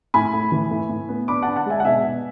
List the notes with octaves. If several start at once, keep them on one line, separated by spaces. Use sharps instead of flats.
A2 G#5 B5
A2
E3
A2
A2
B3
D4 B5 D6
D4 F#5 A5
F#5 A5
G#3 E5 G#5
F#5
B2 E5 G#5
B2